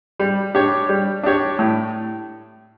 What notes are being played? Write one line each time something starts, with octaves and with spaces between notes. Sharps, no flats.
G3
D4 G4 C#5
G3
D4 G4 C#5
A2